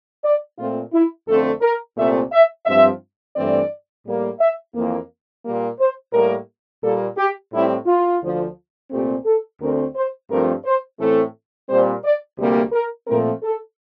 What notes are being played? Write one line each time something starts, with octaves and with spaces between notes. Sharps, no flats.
D5
A#2 A3 C4 F4
E4
F2 D3 A3 C4 A4
A#4
C2 A#2 A3 C4 E5
E5
G2 F3 C4 E5
G2 E3 A3 C4 D5
A2 G3 A#3
E5
F2 E3 A#3
A#2 G3 A#3
C5
A2 G3 A#3 A#4
A#2 G3 A#3 A4
G4
A2 G3 C4 E4
F4
D2 D3 F3
C2 A#2 A3 C4 G4
A4
D2 D3 A3 C4 A#4
C5
G2 F3 A3 C4 A#4
C5
A2 E3 A3 C4 A4
A#2 G3 C4 C5
D5
D2 C3 G3 A#3
A#4
A#2 F3 A3 C4 A#4
A4